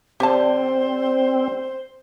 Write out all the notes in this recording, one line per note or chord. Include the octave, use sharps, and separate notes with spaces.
D3 F#3 G3 C4 G4 C5 A5